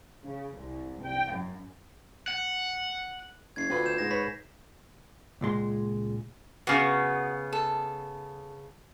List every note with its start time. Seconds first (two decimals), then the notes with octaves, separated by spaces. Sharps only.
0.24 C#3
0.58 C2
1.02 G5
1.32 F#2
2.28 F#5
3.56 F#1 G#6 C7
3.70 D2 C4 F4 B4
3.86 G6 E7
3.98 G#2 A#6
4.11 B4 C#5 B6
5.41 C#2 A#2 G#3 C6
6.67 C#3 B3 F#4
7.53 A4